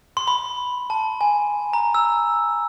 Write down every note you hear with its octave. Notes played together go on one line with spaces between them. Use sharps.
C6
B5
A5
G#5
A#5
E6